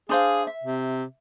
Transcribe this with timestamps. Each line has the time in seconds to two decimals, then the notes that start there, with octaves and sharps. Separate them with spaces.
0.09 D4 G#4 C5 F5
0.47 E5
0.64 C3